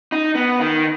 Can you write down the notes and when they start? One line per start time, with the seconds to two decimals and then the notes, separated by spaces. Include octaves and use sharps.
0.12 D#4
0.35 B3
0.60 D#3